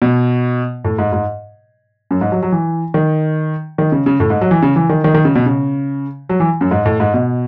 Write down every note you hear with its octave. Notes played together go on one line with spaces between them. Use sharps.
B2
A2
G#2
G#2
F#2
G#2
F#3
F#3
E3
D#3
D#3
C#3
C#3
A2
G#2
F#3
E3
C#3
E3
D#3
D#3
D#3
C#3
B2
C#3
F#3
E3
F#2
G#2
A2
G#2
B2